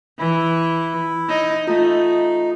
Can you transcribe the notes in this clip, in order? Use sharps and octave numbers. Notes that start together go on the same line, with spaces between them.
E3 E4
D#4
A3 D#4 F4